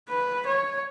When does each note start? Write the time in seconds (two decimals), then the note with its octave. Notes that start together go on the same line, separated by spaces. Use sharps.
0.09 B4
0.46 C#5